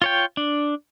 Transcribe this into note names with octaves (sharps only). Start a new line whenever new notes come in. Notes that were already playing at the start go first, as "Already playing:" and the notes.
F4 C#5 G5
D4